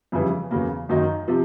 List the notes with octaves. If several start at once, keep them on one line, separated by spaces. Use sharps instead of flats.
F2 C#3 E3 G3
E2 C#3 F#3 A#3
F#2 D#3 F#3 A#3 D#4
C3 F3